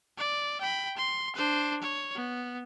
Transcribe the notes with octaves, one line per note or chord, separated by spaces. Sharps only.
D5
G5 B5
C6
D4 C5
C#5
B3